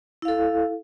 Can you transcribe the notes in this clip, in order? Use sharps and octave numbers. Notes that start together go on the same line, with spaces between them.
E4 A4 F5